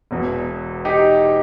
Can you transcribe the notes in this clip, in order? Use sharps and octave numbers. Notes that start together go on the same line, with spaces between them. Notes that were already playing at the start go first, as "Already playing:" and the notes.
E1 E2 B2
D#4 G4